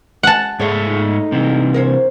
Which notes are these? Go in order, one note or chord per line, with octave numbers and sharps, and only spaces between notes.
F#5 A5
G#2 G#3 A3 C#5 E5
D#4
C3 E3
A#4 C5 C#5